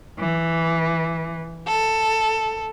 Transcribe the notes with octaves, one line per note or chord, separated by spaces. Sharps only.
E3
A4